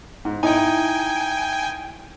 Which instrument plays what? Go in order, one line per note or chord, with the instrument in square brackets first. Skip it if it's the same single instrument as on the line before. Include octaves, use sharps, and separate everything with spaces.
[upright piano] G#2
[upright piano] D#4 E4 [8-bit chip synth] G5 G#5